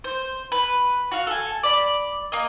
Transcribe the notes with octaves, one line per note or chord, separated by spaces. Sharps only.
C5
B4
F#4 F5
A4 G#5
D5 B5
A#3 D#5